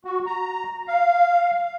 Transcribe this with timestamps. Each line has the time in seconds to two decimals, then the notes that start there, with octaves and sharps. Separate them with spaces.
0.05 F#4
0.26 A#5
0.88 F5